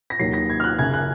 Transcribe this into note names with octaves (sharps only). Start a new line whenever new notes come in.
A#6
D#2 D#3 F#3 C7
A#6
G#6
F6
F#6
F#1 F#2 C#3 G#6
F#6